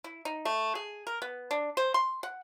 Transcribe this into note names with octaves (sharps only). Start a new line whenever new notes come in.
E4
D#4
A3
G#4
A#4
B3
D4
C5
C6
F#5